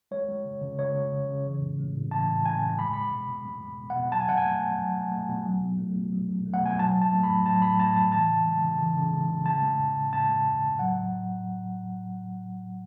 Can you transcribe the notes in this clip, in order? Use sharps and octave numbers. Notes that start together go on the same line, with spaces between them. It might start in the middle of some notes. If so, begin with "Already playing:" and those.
G#3 C#5
G#3
C#3
C#3
G#3 C#5
G#3
C#3
C#3
E3
A2
G#3
A2
E3 A5
A2
G#3 G#5
A2
G#3 B5
G#3 B5
B2
B2
G#3
G#3
B2
F#5
B2
F#3 A5
G#5
B2 F#5
G#5
A3
B2
F#3
B2
A3
B2
F#3
B2
A3
B2
F#3
B2
A3
F#5
B2 G#5
F#3 A5
A2
A5
A3
B5
A2
F#3 A5
A2 B5
A3 A5
A2 A5
E3 A5
C#3
G#3
C#3
E3
C#3
G#3
C#3
G#3 A5
G#3
A2
A2
G#3 A5
G#3
A2
A2
F#3 F#5